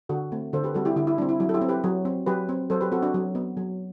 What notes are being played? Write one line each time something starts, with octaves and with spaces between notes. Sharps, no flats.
D3 F#4 A4
A3 C4
D3 A4 C5
G4 B4
G3 C4 F#4 A4
E4 G4
D3 E4 G4
E4
G3 C4 D4
E4
F#3 E4
A4
E4 G4
C4
G4 B4
F#3
C4
F#3 G4 B4
C4
F#3 A4 C5
G4 B4
C4 F#4 A4
D4 F#4
F#3
B3
F#3